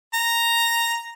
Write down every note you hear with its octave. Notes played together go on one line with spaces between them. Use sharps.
A#5